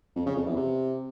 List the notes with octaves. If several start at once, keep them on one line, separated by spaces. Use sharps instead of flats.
F2
C#3
F2
E2
C3